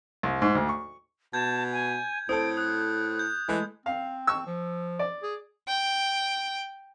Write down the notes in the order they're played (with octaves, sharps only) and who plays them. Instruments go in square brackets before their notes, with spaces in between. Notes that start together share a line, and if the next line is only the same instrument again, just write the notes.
[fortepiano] C2
G#2
D2
C#6
[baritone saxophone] B2 [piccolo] A5 [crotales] G6 G#6
[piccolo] G#5
[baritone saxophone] A2 [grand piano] C4 A4 [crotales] D#6 [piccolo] D7
[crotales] D#6 [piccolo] F#6
[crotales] G6
[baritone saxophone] E3 [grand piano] G#3 A3
[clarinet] C4 [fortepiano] F5
[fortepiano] C#6 E6
[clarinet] F3
[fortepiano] D5
[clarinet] G#4
[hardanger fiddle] G5